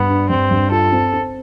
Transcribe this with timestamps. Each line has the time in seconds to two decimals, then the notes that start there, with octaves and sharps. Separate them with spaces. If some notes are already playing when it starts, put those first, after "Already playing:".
Already playing: G2 B3
0.09 D4
0.29 G2 C4
0.51 G2
0.71 F4 A4
0.92 C4
1.13 C4